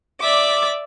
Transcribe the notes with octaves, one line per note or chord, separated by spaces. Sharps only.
D5 E5 D6